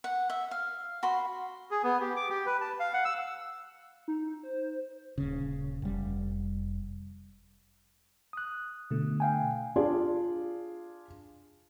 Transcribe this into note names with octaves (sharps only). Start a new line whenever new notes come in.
F#5
E5
F5
F#4 B5 C6
G#4
B3
G4
D6
G4
B4
A5
F5
F#5
E6
D#4
C5
D#1 C#3
F1 G3
D#6 F#6
B2 D3 A3
F5 G5 G#5
D4 F4 G#4 D5